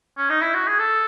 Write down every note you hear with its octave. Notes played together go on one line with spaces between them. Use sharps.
C#4
D#4
E4
F#4
G#4
A4